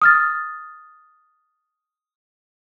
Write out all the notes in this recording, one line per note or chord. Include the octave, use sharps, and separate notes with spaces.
D#6 F6 A6